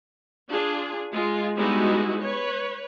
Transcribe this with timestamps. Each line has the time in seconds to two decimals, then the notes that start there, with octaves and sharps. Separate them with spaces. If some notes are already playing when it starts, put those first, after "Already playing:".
0.50 D4 F4 G#4
1.11 G#3 F4
1.56 G3 G#3 B3 D#4 E4 F#4
2.22 B4 C#5